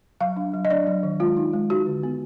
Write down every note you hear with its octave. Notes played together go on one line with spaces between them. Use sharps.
F#3 F5
D4
F#3
D#5
D4 D5
F#3
D#3
G#3 F4
D#4
G#3
D#4 F#4
D3
B3